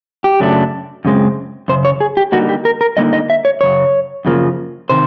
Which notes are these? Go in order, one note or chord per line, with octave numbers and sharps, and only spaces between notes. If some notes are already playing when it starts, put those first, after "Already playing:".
G4
F#2 C#3 F#3 A3 D4
F#2 C#3 G#3 C4
F#2 C#3 C5
C#5
G#4
G4
D3 G3 A#3 D#4 F#4
G4
A#4
A#4
D3 G3 A#3 D#4 D#5
D#5
E5
C#5
F#2 C#3 C#5
F#2 C#3 F3 A#3
C3 D#3 C5